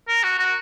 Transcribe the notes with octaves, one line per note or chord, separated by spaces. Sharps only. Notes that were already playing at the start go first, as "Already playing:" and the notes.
A#4
F#4
F#4